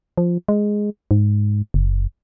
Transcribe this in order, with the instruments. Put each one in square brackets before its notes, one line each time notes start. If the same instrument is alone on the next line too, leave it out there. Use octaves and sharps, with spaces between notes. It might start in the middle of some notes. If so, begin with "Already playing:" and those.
[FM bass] F3
G#3
G#2
F#1